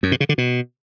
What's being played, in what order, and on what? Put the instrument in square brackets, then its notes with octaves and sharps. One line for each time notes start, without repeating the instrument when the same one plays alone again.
[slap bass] F#2
B2
C#3
D3
B2